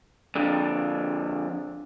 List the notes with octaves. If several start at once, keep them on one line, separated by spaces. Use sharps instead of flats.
F2 D3